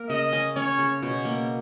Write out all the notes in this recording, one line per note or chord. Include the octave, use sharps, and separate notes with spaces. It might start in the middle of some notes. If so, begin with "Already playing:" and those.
Already playing: A#3 A#4
C#3 D#5
C#4
C#4 C#5
C#3
B2 C#5
A#3